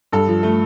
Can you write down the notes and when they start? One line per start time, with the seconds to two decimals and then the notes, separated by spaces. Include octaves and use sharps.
0.12 G2 A4
0.28 F3
0.43 A3